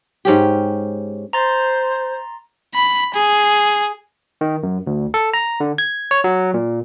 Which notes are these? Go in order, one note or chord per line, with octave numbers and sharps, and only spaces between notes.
G#2 C#4 G4
C5 A#5 C6 A6
B5
G#4
D#3
F#2
D2
A4
A#5
D3
G#6
C#5
F#3
A#2